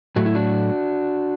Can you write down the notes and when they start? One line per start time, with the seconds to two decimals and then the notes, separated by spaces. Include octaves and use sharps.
0.16 A2 F#3 A3 F#4
0.26 E4
0.35 D4 F#4